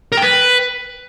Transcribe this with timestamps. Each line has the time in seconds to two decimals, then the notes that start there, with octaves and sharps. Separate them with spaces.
0.12 A#4
0.17 G5
0.22 B4